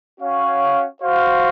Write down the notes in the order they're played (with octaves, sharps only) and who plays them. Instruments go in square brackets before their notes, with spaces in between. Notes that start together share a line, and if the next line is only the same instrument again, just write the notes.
[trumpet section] C#4 F#4 C#5 F5
F#4 C5 F5